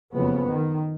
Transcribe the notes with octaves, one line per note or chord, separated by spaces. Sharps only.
F#1 F2 C#3 B3
D#3